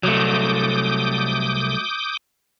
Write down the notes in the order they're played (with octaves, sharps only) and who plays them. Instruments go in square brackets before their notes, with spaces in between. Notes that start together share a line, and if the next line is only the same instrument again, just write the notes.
[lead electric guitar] C2 [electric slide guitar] F#3 A3 [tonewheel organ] D6 D#6 G6